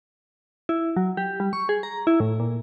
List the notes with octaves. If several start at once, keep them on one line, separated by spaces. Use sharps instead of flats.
E4
F#3
G4
G3
C#6
G#4
A#5
E4
A2
A#2